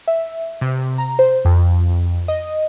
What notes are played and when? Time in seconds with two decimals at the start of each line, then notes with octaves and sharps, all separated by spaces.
0.08 E5
0.61 C3
0.98 A#5
1.19 C5
1.45 F2
2.28 D#5